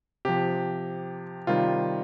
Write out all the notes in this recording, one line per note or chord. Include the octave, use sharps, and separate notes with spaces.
C3 F3 G4
C3 D#3 G3 F4